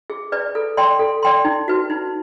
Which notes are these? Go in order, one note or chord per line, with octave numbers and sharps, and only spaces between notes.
G#4
B4 D5
A4
D5 G5 C6
A4
D5 G5 C6
D#4
F#4 B4
D#4